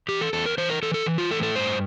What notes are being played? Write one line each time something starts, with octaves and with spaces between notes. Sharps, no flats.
E3 G4
A4
E2 A4
A#4
E3 C5
A#4
E3 A4
A4
E3
F4
A2 A4
A4
G2 C5